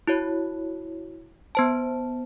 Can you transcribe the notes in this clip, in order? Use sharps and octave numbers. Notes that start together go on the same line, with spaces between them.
E4 F#4 C#5
B3 C5 A5